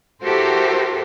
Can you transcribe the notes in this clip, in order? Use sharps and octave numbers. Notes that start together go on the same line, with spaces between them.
E4 F#4 G4 A4 A#4 C5